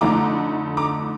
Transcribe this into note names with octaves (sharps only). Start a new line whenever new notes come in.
F2 D3 A3 D#4 A#5 D6
A#5 D6